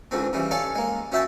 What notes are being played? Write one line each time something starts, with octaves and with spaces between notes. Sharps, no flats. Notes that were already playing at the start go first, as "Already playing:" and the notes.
C#2 G#2 D3 C4
C#3 E3 G3
A4 C#5 D5 F5 G#5 A5
G#3 A#3
C#4 F#4 E5 G5 A5